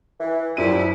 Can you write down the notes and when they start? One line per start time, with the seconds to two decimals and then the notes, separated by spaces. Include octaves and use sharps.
0.19 E3
0.57 F#2 A#2 F3 G3 E4 D#7